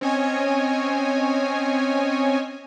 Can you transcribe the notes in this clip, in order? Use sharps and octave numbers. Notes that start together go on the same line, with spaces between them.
C4 C#4 C#5 D#5 G#5